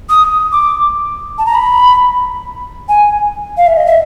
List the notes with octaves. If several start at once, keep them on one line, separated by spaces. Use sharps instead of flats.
D#6
D6
A5
A#5
B5
G#5
F5
E5
D#5
E5